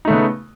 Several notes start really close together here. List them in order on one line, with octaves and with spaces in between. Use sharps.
D#4 A3 C#3 B3